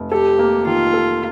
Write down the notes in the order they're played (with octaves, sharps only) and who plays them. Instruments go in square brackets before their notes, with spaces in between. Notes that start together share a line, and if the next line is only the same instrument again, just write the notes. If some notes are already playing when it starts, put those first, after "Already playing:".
Already playing: [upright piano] F1
[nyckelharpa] G4 [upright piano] A4
[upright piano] A#3
[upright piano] D#3 [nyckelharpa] F4
[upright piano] A4